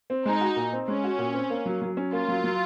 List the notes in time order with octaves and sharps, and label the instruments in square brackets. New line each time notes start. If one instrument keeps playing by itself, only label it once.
[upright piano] C4
[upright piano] G#3 [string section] D#4
[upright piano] F#4
A#2
C4
[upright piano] G#3 [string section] C#4
[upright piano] F#4
A#2
C4
A#3
F#3
F#3
C#4
[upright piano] A#3 [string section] F4
[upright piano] F#3
F#3